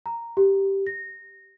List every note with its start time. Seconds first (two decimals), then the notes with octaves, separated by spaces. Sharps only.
0.06 A#5
0.37 G4
0.87 A#6